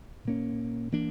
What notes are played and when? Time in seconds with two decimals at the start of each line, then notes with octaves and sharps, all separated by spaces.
0.25 A#2 A#3 C#4
0.92 E3 A#3 D4